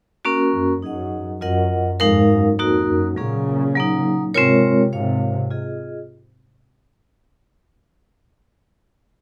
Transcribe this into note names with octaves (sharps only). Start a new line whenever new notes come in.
A#3 C#4 F#4 A#4
F#2
F#2 D#4 G#4 D#5 F#5
F#2 F4 A#4 D#5 F#5
F2 G#2 G#3 D#4 A#4 F5
F#2
F2 A#3 D#4 F#4 A#4
F#2
A#2 C#3 F#3 A#3 C#4 G#4
F#3 A#3 D#4
G#2 C3 G#3 C4 F4 A#4 C#5
G#2 C3 F4 A#4 C#5 F5
F4 G#4 D#5